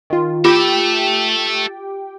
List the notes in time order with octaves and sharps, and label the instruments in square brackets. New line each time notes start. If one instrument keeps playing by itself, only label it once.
[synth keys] D#3 F4
[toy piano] F4 [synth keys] G4 G5 D6 [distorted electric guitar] A4 E5